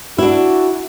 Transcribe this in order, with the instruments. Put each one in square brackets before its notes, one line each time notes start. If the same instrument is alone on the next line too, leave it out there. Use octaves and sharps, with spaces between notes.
[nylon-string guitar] D4 E4 [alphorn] F#4